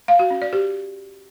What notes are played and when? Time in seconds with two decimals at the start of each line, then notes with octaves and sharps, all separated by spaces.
0.08 F5
0.19 F#4
0.30 C#4
0.42 D5
0.53 G4